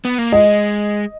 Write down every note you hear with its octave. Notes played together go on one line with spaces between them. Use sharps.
B3
A#3
G#3 D#5